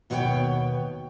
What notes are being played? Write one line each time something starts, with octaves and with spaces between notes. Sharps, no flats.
D#2 B2 B3 D4 C#5 G5